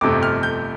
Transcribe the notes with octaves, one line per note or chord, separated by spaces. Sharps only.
G1 F2 C3 A3 D6
F6
G6